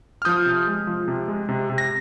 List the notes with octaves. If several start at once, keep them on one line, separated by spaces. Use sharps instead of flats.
F6
F3 D#6 G6
C3
G#3
F3
C3
G#3
C3
C3
A#6